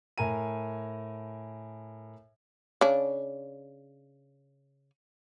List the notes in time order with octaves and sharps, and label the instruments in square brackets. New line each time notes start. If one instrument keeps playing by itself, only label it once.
[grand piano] A2 A#4 G#5 A#5 D#7
[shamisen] C#3 D4